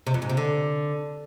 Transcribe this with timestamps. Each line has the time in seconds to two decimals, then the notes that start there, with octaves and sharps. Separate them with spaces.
0.07 C3
0.14 F2
0.22 G#2
0.30 C3
0.37 D3